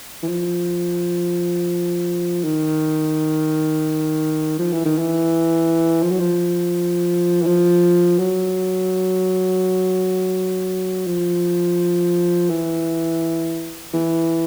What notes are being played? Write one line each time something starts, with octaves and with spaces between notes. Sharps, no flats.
E3
F3
D#3
F3
E3
D#3
E3
F3
F#3
F3
E3
F3
F#3
F3
E3
E3